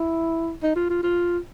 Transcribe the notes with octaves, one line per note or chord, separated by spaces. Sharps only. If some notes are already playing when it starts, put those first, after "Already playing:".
Already playing: E4
D#4
F4
F4
F4